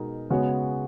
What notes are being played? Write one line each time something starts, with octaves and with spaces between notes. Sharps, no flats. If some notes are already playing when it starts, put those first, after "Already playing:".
Already playing: B2 G#3 D#4 A#4
C#3 G#3 B3 F#4 C#5